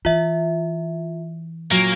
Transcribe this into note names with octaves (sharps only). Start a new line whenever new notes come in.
E3 F4 E5
A#2 F#3 A#3